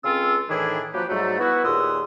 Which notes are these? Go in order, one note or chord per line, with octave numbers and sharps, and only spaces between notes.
C#2 C#3 C4 F4 A4 E6
A2 D#3 E3 D4 E4 G#4
F3 F#3 A#3 G4 B4
G#2 F#3 G3 A3
B3 E4 F#4
D#2 A#2 G#4 C6 D#6 E6